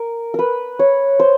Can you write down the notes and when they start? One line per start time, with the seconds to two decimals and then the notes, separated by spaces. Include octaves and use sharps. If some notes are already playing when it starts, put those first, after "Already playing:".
Already playing: A#4
0.34 A#4 B4
0.79 C#5
1.20 C5